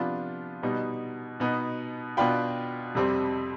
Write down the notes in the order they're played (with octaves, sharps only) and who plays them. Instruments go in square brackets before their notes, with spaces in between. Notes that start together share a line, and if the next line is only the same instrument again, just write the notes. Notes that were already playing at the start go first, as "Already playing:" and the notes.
Already playing: [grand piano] C3 F3 B3 D4 F4
B2 G3 B3 D#4
B2 B3 D#4
B2 B3 D4 F4 G5 B5
F2 C3 G3 C4